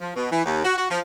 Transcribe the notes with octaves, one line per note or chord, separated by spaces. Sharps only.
F3
B2
E3
D#2
F#4
F#4
F3